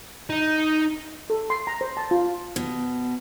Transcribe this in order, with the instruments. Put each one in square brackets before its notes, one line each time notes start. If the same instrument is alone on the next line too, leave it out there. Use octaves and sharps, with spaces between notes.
[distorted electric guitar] D#4
[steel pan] A4
C6
A#5
C5
A5
F4
[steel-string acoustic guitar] B2